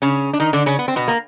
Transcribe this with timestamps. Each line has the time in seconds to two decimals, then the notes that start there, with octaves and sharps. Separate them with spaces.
0.02 C#3 C#4
0.33 D4
0.40 D#3 D#4
0.53 D3 D4
0.66 C#3 C#4
0.79 B3
0.88 C4
0.96 B2 B3
1.08 A#3